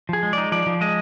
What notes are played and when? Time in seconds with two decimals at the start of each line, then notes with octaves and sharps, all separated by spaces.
0.09 F3 G#4
0.23 G#3
0.33 D#4 D5
0.52 F3 D5
0.66 F3
0.81 G#3 D#5